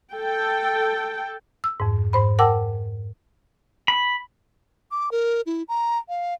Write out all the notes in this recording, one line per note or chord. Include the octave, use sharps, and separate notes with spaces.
A4 G5
E6
F2 G#2
G#2 C5 B5
A#4 F#5 G5 A5 D6 E6
B5
D6
A#4
E4
A#5
F5